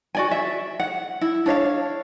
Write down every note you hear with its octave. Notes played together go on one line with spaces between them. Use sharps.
F#4 D5 G#5
E5
F#5
E4
D4 C#5 E5 F5